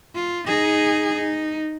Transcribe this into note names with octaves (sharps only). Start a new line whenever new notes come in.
F4
D#4 G#4
D#4